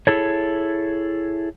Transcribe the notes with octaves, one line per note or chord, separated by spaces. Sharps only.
E4 G#4 A4 C#5